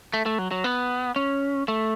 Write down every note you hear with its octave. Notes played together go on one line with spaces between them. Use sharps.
A3
A3
F#3
F#3
B3
C#4
A3